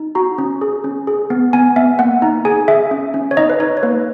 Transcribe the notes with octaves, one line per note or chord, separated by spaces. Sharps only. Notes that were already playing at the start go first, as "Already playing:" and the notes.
Already playing: D#4
F#4 A#5
C#4
G#4
C#4
G#4
B3
B3 G#5
B3 E5
A#3 F#5
D#4 A#5
G#4 G#5
G#4 E5
C#4
C#4
C#5
D#4 D#5
B4
D#4 C#5
C#5
A#3 B4